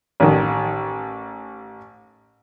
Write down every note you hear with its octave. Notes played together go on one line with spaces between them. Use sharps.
A1 D#3